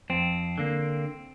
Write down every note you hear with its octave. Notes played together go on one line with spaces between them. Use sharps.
F2 C4
D3 A#3